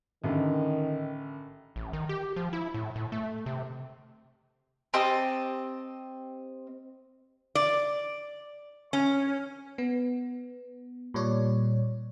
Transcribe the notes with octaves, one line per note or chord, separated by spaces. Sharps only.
A1 D3 D#3
A1
D#3
G4
F3
E4
A2
A2
A3
C3
C4 G4 D#5 A5
D5
C#4
B3
A#2 G3 C#5 D5